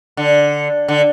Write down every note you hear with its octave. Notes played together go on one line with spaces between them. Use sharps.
D3
D3